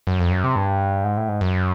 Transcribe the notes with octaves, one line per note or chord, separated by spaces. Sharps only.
F#2
F2
F#2
C3
G2
G#2
A2
G#2
F#2